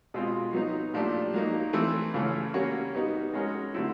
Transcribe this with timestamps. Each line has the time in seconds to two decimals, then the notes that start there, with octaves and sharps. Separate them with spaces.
0.14 B2 G#3 C4 F4
0.53 F#3 B3 D#4
0.94 A#2 F3 A3 D4 G4
1.34 F#3 A#3 D#4
1.73 E3 A3 C4 E4
2.14 C#3 E3 A3 C#4
2.54 G3 A#3 C#4 F#4
2.94 G3 B3 D#4 F#4
3.34 G#3 C#4 F#4 A#4
3.74 D3 F#3 A3 C4 E4